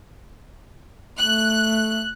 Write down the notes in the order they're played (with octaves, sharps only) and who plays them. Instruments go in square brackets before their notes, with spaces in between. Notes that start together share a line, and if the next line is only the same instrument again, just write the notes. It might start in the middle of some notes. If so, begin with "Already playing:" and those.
[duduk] A3 [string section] F#6